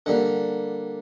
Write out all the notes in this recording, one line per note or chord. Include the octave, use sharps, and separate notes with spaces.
D3 G3 A#3 F#5